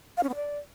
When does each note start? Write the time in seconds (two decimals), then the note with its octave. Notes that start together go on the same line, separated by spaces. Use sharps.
0.17 F5
0.23 C#4
0.29 B3
0.35 D5